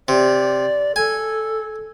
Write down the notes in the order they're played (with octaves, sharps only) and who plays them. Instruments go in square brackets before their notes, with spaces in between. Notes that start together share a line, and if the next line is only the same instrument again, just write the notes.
[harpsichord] C3 [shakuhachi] D5
[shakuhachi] A4 [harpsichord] G#5